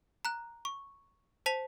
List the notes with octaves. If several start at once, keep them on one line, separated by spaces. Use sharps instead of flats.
A#5 F#6
C#6
C5 A5 B6 F7